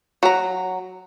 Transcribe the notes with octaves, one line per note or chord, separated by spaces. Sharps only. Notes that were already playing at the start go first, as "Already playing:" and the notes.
F#3 A#5